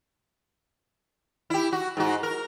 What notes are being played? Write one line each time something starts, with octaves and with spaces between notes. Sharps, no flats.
E4 G4
F#4
G#2 F#4
A#4